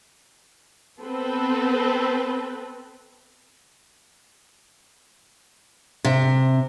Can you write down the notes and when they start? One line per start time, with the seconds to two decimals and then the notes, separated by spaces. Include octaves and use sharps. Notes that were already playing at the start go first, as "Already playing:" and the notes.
1.00 B3 C4 A4 B4
6.05 C3